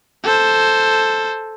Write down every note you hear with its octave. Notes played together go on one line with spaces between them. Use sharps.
A4 C5